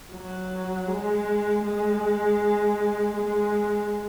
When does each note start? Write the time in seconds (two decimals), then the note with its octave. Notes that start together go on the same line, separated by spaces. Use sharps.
0.12 F#3
0.88 G#3
1.64 G#3
3.16 G#3